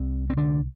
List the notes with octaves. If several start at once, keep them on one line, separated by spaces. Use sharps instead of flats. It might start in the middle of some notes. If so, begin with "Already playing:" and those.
Already playing: C2 C3 C4
C4
D3 D4